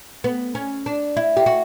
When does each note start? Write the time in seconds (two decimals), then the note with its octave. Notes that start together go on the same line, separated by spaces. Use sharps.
0.24 B3
0.55 C#4
0.86 D4
1.16 E4
1.37 G4
1.46 F#4